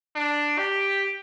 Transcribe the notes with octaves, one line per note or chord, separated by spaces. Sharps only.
D4
G4